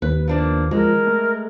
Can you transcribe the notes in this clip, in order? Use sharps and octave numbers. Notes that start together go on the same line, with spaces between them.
D#2 B4
F3 A#3 D4 D5
F3 G#3 A#4
A3